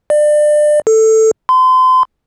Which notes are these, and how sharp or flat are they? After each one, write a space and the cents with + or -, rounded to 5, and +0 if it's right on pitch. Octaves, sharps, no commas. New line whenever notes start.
D5 +30
A4 +5
C6 -35